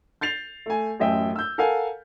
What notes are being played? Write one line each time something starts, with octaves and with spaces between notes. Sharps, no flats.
G6 A6 C7 F7
A3 G#5
A1 F#2 D#5 E5 G5
E6 G6
A4 A#4 F5 F#5 G#5